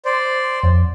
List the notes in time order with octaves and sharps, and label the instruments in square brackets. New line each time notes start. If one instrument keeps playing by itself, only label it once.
[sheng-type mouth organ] C5 D5
[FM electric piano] F2